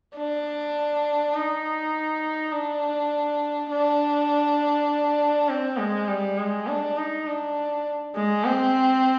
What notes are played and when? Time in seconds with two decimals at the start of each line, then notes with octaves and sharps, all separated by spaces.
0.16 D4
1.35 D#4
2.52 D4
3.71 D4
5.49 C4
5.78 G#3
6.08 G3
6.38 G#3
6.68 D4
6.97 D#4
7.27 D4
8.16 G#3
8.44 C4